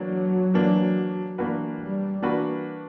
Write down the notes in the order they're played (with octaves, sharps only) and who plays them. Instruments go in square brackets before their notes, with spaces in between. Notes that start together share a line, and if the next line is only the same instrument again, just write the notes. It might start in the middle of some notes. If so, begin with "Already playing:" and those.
Already playing: [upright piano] E3 A#3 D4 A#4 [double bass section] F#3
[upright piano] E3 A#3 D4 A#4
E3 A#3 D4 F#4 B4
[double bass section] G3
[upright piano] E3 A#3 D4 F#4 B4